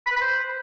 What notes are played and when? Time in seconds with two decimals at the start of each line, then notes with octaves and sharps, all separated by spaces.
0.06 B5
0.11 B4
0.16 B5
0.21 C5